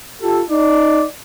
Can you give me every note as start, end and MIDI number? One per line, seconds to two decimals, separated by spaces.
0.21 0.40 65
0.21 0.40 67
0.21 0.40 69
0.50 1.04 63
0.50 1.04 74